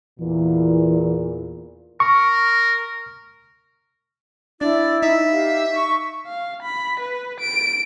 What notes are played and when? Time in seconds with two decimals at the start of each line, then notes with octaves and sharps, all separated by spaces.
0.20 E2 A#2 E3
2.00 A#4 C#6
4.61 D4 E4 D5
5.03 D#4 E5
5.32 G4 F5
5.73 C#6
6.27 F5
6.62 B5
7.00 B4
7.40 D7